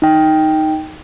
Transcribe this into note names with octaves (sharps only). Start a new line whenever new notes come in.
D#4 G5